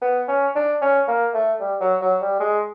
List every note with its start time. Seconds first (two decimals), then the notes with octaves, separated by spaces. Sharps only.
0.02 B3
0.28 C#4
0.55 D4
0.82 C#4
1.08 A#3
1.34 A3
1.61 G3
1.80 F#3
2.01 F#3
2.21 G3
2.40 G#3